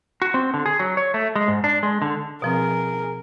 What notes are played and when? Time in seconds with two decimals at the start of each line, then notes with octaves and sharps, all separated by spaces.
0.22 F#4
0.34 C4
0.54 D3
0.66 G#4
0.79 F#3
0.97 C#5
1.14 A3
1.36 G#3
1.48 G#2
1.64 D4
1.83 G#3
2.02 D3
2.42 B2 F3 C4 G#4 A#4